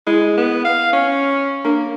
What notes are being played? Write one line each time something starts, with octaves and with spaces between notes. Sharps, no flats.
G#3 E4
B3
F5
C#4
A#3 D4